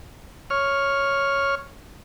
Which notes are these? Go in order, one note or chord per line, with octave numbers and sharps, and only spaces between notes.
C#5 F6